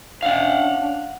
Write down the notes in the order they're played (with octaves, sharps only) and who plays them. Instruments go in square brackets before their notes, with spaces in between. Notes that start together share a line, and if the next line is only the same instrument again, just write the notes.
[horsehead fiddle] C#4 D4 [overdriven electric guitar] F5 F#5